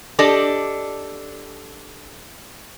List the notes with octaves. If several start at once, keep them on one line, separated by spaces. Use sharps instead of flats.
D4 G4 A4 D5 D#5